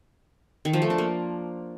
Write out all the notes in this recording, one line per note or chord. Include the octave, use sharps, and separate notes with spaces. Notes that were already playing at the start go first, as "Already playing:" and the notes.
D#3
F3
A3
D4
A#3